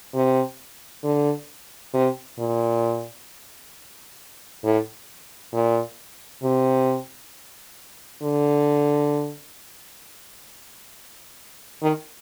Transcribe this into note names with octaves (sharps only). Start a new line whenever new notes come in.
C3
D3
C3
A#2
A2
A#2
C3
D3
D#3